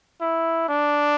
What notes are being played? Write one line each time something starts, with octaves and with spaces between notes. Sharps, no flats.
E4
D4